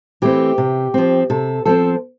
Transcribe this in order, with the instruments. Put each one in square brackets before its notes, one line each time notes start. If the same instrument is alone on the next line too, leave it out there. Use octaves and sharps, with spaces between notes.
[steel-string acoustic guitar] E3 A3 C4 G4
C3
F3 C4
C3 A4
F3 C4 A4